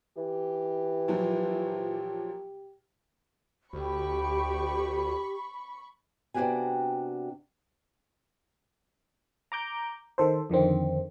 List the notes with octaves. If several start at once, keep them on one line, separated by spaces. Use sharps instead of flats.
E3 G4
A#2 F3 F#3
D2 G4 B5 C#6
C3 B3 D4 F#4 G4 G#5
A#5 D6 G6
D#3 A4 C5
F2 D3 D#3 C4